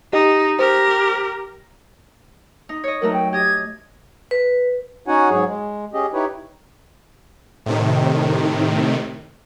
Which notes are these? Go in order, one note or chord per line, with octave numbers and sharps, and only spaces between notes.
D#4 G4 D#5
G4 A#4 C5
D#4
C#5 D#5
F#3 A3 D#4 A#4
G5
G4 D#5 G#6
B4
C#4 D#4 F#4 C#5 F#5 G#5
G#2 F#3 G#4 C#5
G#3
C#4 G4 G#4 D#5
D#4 E4 G4 B4 C#5
A2 C3 D#3